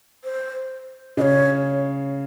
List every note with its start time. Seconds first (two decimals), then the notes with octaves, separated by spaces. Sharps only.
0.24 C5
1.17 C#3 D#5
1.22 C#5